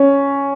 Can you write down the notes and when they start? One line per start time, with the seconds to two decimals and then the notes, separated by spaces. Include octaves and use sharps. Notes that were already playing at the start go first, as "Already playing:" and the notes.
Already playing: C#4